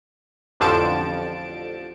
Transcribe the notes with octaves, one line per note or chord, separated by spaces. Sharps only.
A1 F2 D3 F3 A5 D7